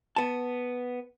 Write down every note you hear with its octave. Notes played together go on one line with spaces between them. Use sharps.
B3 A5